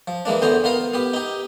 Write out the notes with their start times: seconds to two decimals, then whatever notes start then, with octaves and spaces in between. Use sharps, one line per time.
0.08 F3
0.25 E3 G#3 A#3 D4
0.42 E2 D3 B3 C5 G5 A#5
0.64 B3 F4 A#4 F5
0.94 B3 G4
1.14 D#4 G4